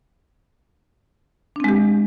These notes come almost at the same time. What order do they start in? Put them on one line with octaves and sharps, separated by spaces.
D4 C4 G#3 G4